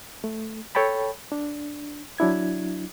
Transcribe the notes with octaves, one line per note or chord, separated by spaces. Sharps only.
A3
A4 C#5 G5 A5 B5
D4
F#3 D4 E4 G#6